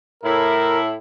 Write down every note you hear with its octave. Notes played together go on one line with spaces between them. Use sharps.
A2 E4 A#4